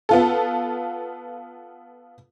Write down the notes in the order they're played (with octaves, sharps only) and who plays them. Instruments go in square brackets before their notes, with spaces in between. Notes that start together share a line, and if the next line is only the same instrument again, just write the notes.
[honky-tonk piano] B3 F4 A4